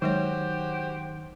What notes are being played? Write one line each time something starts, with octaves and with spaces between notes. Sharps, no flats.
D#3 F#3 G#3 F#4 G4 C5 C#5